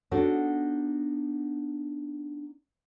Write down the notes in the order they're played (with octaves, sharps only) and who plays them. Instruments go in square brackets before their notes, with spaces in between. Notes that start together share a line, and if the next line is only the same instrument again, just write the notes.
[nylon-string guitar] B3 D4 D#4 F#4 A4 C#5